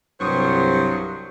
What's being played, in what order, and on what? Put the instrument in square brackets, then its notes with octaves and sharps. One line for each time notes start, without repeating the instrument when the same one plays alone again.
[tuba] C2 [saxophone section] G2 F#3 [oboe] C5 [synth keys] C#6 D#6